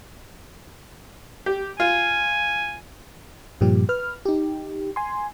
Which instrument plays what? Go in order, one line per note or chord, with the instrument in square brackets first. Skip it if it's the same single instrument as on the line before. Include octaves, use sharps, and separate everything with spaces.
[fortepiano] G4
[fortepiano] F4 [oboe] G#5
[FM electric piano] G2 A#2 F3 G3 G4
B4 F6
D#4 G4
G#5 C6